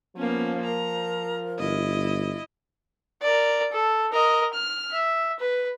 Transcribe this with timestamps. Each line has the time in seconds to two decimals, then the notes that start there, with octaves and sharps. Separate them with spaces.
0.17 F3 A#3 B3 C#4
0.66 A#4 A#5
1.59 G1 E4 D#5
3.22 A#4 D5
3.72 A4
4.12 A#4 D#5
4.54 F6
4.93 E5
5.40 B4